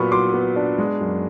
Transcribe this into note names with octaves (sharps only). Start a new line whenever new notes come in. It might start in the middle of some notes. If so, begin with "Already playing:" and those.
Already playing: A#2 F#3 B3 B5 C#6
F#3 C6 D6
B3
D4
G#3
F#2